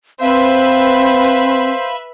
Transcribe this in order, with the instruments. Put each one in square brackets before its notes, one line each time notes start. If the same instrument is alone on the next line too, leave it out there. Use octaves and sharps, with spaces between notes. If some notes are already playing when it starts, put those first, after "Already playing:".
[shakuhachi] C4 [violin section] B4 E5 B5 [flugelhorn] C5 [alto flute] F5